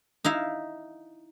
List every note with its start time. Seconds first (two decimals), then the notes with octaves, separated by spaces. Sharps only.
0.24 D#4 E4 F5